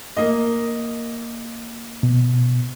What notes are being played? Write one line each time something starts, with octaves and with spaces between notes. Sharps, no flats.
A#3 D#5
B2